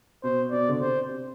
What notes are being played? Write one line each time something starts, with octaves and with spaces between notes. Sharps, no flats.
B2 C5
B2 D5
D3
C3 C5
C3